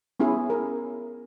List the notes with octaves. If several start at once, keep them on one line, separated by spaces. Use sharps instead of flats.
B3 C#4 E4 G#4
A#4